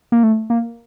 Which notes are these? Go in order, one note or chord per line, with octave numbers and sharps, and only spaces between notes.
A#3
A3
A#3